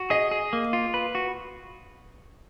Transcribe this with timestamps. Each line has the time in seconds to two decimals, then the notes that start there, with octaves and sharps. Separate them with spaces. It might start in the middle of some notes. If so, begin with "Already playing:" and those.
Already playing: F#4
0.10 G#4 D#5
0.31 G#4
0.53 A#3
0.73 F4
0.94 B4
1.15 F#4